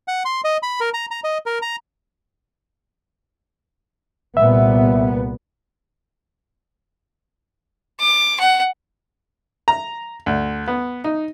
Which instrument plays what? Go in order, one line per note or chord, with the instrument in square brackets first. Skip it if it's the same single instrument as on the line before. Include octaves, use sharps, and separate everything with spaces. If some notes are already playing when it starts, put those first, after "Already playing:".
[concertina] F#5
C6
D#5
B5
A#4
A#5
A#5
D#5
A#4
A#5
[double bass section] C2 A#2 B3 [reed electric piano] E5
[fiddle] D6
F#5
[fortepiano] A#5
D2
B3
D#4